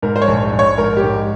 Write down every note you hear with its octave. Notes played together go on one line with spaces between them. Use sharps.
G#2 A#4
C5
C#5
A#1
A#1
C#5
G#2 A#4
G4
G#2